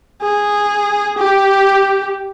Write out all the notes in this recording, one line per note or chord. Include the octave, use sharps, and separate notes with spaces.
G#4
G4